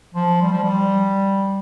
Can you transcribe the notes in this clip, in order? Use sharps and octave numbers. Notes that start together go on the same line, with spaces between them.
F3
G3
F3
G3